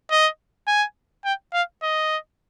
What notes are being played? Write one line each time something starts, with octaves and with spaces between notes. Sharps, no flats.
D#5
G#5
G5
F5
D#5